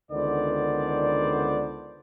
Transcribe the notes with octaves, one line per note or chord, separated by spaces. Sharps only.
C#2 D3 D#3 B3 C5 D5